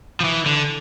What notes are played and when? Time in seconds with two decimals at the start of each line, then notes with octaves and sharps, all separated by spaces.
0.20 F3
0.24 E3
0.46 D3